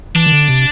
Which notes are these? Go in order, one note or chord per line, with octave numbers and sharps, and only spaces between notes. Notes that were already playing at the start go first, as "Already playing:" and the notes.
E3 D4
D#3
D3
C3